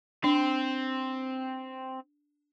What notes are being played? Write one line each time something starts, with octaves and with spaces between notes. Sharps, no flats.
C4 D4